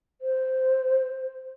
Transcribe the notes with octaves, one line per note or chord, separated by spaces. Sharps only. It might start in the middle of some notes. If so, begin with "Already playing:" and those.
C5